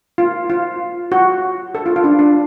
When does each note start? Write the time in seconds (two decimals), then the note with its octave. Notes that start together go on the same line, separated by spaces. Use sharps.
0.18 F4
0.50 F4
1.12 F#4
1.75 A4
1.86 F4
1.96 F4
2.04 D4
2.19 D4